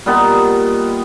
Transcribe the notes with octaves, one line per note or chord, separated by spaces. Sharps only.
A#2 G3 B3 D#4